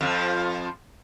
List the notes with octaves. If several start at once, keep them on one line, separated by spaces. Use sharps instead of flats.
F2 F3